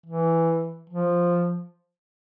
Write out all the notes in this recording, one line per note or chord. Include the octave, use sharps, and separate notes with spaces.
E3
F3